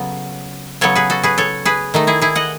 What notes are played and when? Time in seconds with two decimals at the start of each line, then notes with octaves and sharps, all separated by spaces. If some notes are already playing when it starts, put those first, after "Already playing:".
Already playing: C#3 F#3 B3 A4
0.81 C#3 F#3 B3 A4 C#5
0.95 G#4 B4
1.10 F#4 A4
1.23 G#4 B4
1.38 A4 C#5
1.65 G#4 B4
1.94 D#3 A3 D#4
2.07 E4 G#4
2.22 E4 G#4
2.35 D#5 F#5